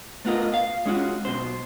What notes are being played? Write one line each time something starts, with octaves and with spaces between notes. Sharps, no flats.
A3 B3 F4 A#4 D#5
F5
G#3 C#4 F4 F#4
B1 B2 C5